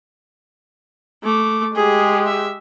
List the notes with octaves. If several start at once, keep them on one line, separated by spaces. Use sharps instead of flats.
A3 D6
G#3 G4 G#4
E5